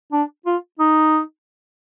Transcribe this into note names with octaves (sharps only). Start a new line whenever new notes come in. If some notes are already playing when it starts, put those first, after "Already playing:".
D4
F4
D#4